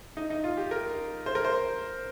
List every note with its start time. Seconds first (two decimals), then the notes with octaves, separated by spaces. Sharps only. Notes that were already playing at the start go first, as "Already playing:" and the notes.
0.17 D#4
0.30 D#4
0.44 F4
0.57 G4
0.71 A#4
1.26 C5
1.35 A#4
1.45 C5